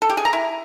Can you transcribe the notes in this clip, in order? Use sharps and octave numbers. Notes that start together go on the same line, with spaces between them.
A4
G4
G#4
A#5
E4